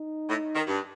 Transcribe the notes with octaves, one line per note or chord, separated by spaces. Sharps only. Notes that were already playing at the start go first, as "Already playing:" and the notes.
Already playing: D#4
A2
D#3
G2